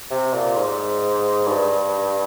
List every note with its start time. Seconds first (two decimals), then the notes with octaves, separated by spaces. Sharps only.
0.11 C3
0.34 A#2
0.57 G#2
1.48 G2